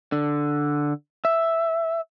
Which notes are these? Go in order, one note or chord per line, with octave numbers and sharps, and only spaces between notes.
D3
E5